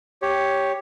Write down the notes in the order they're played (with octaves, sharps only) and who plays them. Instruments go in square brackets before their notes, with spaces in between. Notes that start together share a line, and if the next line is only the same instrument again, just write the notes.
[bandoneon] G4 C#5